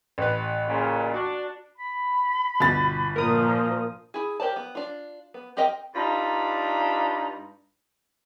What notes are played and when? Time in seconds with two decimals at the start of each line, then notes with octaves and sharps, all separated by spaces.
0.18 A1 B4
0.66 A#2 C#3 F4
1.14 D4 F#4
1.77 B5
2.60 G1 B2 A6
3.16 A#2 F3 A#4 D#6
4.14 E4 G#4
4.40 G4 A#4 C5 D5 A5
4.56 B3
4.75 D4 F4
5.34 B3
5.57 C4 G4 A#4 D#5 G5
5.95 G2 D4 D#4 F4 A#5 B5